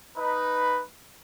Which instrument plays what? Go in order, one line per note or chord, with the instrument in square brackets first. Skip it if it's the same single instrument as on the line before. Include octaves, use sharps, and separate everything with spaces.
[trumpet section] D#4 B4